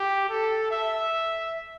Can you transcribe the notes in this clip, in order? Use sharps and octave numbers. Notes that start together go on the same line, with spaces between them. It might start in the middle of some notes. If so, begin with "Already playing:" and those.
Already playing: G4
A4
E5